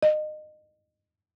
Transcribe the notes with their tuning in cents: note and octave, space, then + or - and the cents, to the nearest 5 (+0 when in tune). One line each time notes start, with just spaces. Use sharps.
D#5 -30